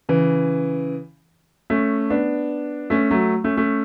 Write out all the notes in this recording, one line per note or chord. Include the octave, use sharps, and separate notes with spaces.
C#3 E3
A3 C#4
B3 D4
A3 C#4
F#3 A3
A3 C#4
A3 C#4